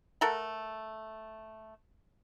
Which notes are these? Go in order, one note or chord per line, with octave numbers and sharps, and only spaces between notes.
A3 A4 A#4 F#5